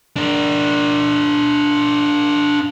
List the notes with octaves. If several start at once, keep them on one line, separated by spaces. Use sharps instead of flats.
D4 A#4